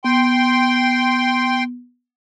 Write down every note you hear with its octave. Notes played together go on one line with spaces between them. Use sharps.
B3 G5 C6